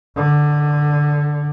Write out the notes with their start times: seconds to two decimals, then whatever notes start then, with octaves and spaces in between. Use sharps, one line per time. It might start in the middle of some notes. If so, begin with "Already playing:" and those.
0.17 D3